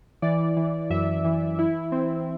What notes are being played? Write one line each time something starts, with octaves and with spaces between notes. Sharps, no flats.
E3 D5
E3
F#2 E5
E3
E4
C4